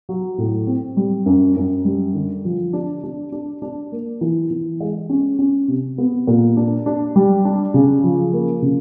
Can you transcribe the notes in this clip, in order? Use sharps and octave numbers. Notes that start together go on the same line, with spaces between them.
F#3
A2
C4
G3
F#2
F#2
G3
D3
F3
D4
D4
D4
D4
A#3
E3
E3
G#3
C#4
C#4
C3
B3
A#2
D4
D4
G3
D4
C#3
F3
A#3
C#3